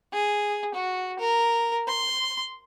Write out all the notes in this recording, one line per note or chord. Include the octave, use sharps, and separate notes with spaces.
G#4
F#4
A#4
C6